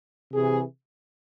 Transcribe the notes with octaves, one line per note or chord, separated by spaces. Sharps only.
C3 E3 G#4